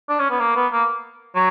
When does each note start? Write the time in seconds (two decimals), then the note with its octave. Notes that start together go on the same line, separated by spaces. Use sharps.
0.09 D4
0.19 C#4
0.30 B3
0.40 A#3
0.56 B3
0.72 A#3
1.35 F#3